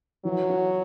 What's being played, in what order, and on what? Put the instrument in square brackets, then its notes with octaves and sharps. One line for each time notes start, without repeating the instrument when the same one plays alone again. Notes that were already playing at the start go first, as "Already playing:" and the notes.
[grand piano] E3 [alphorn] F#3
[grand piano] F#4